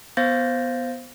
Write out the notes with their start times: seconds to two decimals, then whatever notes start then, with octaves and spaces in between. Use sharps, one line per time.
0.17 B3 C5 F5 G6 A6 A#6